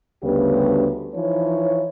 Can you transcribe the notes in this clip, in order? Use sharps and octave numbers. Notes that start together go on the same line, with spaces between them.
D2 C#3 G3 B3 D4 G4
E3 F3 D#4 C#5